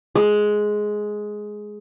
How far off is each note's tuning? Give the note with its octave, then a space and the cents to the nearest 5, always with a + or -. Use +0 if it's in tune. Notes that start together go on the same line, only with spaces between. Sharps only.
G#3 +10